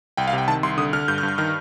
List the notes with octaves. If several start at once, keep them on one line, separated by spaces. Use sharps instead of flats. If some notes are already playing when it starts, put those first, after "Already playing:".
C2 G5
F5
C3
G5
D#3 A5
C2 C6
D3 D#6
D3 F6
G2 G6
F6
G2
G6
D#3 F6